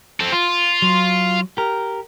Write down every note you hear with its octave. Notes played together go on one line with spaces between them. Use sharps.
C4 A4
F4
F#3
G4 A#4